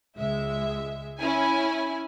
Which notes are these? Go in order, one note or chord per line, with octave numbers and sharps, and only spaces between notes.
C#2 G#3 E5
C#4 E4 G#5